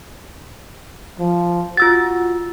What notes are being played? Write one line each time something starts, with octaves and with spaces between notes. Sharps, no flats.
F3
F4 F#4 E6 A6